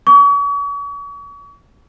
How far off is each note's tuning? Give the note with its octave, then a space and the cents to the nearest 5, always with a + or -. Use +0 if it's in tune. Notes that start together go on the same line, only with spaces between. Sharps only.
C#6 +40